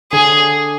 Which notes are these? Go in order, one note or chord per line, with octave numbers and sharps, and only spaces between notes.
D3 G#4